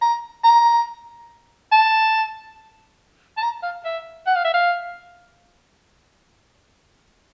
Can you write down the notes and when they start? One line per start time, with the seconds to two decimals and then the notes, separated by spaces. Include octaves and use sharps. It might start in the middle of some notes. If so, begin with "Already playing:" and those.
0.02 A#5
0.44 A#5
1.72 A5
3.38 A5
3.43 A#5
3.63 F5
3.85 E5
4.27 F#5
4.36 F5
4.45 E5
4.54 F5